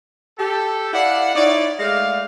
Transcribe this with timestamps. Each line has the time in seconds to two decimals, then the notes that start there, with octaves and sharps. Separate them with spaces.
0.39 G4 A4
0.94 E4 D5 F5 F#5
1.35 D#4 E4 C#5 D5
1.79 G#3 A3 D5 F5